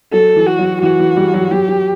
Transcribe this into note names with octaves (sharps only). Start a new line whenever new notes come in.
F#3 A4
E3
F#4
F#3
E3 F#4
E3
E3 G3
F#3
F#3 G4
F#3